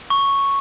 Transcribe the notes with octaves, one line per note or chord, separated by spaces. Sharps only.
C#6